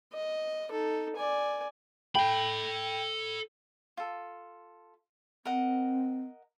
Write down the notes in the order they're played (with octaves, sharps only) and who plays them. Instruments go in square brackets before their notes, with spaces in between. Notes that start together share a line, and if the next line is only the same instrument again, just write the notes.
[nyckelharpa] D#5
D#4 A4
D5 G#5
[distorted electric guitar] A4 B5 [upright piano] G5
[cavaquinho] F4 A4
[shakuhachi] C4 [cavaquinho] A#4 D#5 F#5